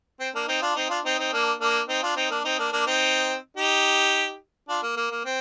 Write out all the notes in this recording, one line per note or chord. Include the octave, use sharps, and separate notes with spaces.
C4
A#3 D4
C4 D#4
D4 F4
C4 D#4
D4 F4
C4 D#4
C4 D#4
A#3 D4
A#3 D4
C4 D#4
D4 F4
C4 D#4
A#3 D4
C4 D#4
A#3 D4
A#3 D4
C4 D#4
D#4 G4
D4 F4
A#3
A#3
A#3
C4